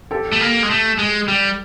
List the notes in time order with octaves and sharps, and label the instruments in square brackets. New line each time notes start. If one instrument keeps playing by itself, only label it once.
[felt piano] G4 A4
[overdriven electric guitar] A3
A#3
G#3
A3
G#3
G3